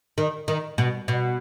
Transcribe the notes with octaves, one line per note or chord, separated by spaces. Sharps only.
D#3
D#3
B2
B2